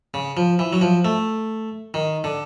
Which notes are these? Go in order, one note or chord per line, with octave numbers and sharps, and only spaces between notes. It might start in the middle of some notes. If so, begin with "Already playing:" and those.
C#3
F3
E3
F#3
F3
A3
D#3
D3